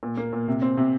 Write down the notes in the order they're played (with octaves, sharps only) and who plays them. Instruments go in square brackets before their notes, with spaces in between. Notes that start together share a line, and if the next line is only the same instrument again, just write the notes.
[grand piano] A#2
A#3
A#2
C3
C4
C3